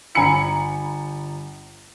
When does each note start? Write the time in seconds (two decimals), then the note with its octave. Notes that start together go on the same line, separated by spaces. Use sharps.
0.15 G1 G#5 A#5 B5 C#7 F#7